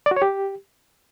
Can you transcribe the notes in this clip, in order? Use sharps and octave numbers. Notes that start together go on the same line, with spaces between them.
D5
F#4
C#5
G4